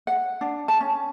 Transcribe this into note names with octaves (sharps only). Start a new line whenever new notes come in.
F#5
D4
A5
C#4